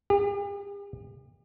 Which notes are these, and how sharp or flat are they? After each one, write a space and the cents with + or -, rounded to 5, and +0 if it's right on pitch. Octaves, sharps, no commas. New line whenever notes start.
G4 +45